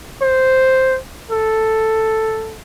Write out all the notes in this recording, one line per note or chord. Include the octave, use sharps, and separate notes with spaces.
C5
A4